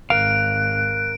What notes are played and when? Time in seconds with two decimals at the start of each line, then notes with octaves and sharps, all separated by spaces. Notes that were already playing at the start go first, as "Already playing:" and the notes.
0.10 G#1 A#4 F5 F#6 D7